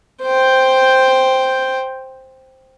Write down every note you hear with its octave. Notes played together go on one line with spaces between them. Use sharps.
C5 G5